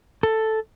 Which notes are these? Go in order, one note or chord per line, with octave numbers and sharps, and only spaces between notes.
A4